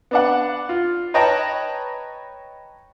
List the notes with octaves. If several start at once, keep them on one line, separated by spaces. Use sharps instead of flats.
B3 D4 F#5
F4
B4 C#5 D#5 G5 A5 A#5